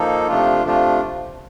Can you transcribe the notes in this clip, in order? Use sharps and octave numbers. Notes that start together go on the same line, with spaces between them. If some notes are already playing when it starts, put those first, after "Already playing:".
Already playing: F3 A#3 D#4 A4
C3 F3 A3 D4 F4
C3 F3 A3 D4 F4